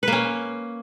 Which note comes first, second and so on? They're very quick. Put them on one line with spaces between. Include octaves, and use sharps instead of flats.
B4 A#3 C#4